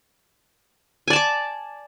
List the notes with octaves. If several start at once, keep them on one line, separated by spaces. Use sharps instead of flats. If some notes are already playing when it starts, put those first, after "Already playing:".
D5 G#5 A5 D6